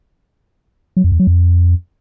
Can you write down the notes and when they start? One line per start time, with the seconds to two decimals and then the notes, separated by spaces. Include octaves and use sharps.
0.97 F#3
1.04 F2
1.12 E2
1.19 F#3
1.27 F2